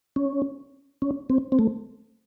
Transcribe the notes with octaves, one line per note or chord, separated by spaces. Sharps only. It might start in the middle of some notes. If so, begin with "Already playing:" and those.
C#4
C#4
C4
C4
A3